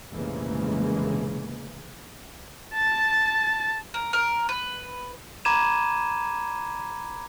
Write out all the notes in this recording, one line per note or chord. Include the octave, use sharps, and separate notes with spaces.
F1 A#1 C#3 E3 G#3 A#3
A5 A6
A#4
A#4
B4
A#5 B5 D6 G#6 D#7 E7